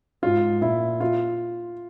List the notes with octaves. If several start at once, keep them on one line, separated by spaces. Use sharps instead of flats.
G#2 F4
A#2 E4
F4